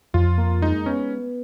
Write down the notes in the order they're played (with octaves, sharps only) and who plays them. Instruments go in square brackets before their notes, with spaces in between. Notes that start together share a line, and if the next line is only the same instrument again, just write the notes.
[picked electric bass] F2 [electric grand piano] F4
[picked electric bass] A#3
[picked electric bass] G#3 [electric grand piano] D#4
[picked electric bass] B3 [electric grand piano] C#4